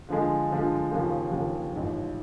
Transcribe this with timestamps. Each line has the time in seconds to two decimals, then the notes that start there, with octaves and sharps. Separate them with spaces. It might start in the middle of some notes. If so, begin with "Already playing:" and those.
0.09 D3 F3 G#3
0.50 D3 F3 G#3
0.91 D#2 C#3 F3 A#3
1.31 D#2 C#3 F3 A#3
1.72 A1 G#2 F3